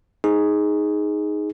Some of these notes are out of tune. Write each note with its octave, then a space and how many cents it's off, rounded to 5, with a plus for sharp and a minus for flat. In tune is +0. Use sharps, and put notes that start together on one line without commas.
D#4 +5 G#4 +0